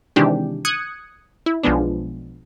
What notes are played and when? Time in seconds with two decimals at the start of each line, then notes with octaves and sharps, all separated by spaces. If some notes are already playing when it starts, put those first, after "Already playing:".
0.16 C3 D#3 E3 G#3 D4 G4
0.65 D#6 F#6 G#6 C#7
1.46 E4
1.63 B1 F3 G#3 B3 D4